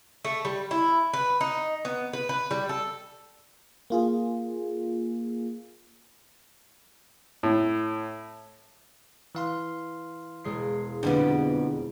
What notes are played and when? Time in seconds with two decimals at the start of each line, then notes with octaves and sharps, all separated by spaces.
0.25 A3
0.45 G3
0.71 E4
1.13 B4
1.41 D#4
1.85 B3
2.13 B4
2.29 B4
2.51 G3
2.69 A4
3.90 A#3 F4 G#4
7.43 A2
9.35 E3 F5 C6
10.44 E1 G#3 C7
11.03 F2 D3 G3 B3